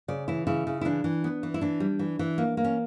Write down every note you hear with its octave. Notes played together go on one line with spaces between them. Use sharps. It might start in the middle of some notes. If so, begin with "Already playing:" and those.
C#3 D5
E3 E4
C#3 E4
C#3
E4
E3 D4
E3
B3
E3
E4
E3 D4
G3
E3
E3
A#3
A#3
C#4